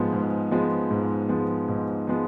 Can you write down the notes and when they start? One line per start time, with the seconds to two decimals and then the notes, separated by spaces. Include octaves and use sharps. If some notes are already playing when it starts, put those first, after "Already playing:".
Already playing: G#2 F3 G#3 B3
0.12 G#2
0.51 F3 G#3 B3
0.91 G#2
1.29 F3 G#3 B3
1.68 G#2
2.07 F3 G#3 B3